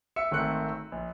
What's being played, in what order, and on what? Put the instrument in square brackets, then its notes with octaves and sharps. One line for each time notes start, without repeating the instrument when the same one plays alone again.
[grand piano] E5 E6 C#7
G#1 D#3 A3 C4 F#6 C#7
A#1